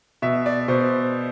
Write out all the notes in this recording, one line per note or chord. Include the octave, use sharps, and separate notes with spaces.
B2 E5
D5
B2 C5